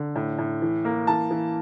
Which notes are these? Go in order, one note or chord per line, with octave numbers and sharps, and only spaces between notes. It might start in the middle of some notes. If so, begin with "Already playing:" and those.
Already playing: D3
A2
A2
E3
A#3
E3 A5
E3